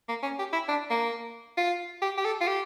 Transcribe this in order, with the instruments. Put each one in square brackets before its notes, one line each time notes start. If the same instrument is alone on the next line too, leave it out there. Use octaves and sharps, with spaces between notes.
[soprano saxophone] A#3
C#4
G4
E4
D4
A#3
F4
G4
G4
A4
F4
G4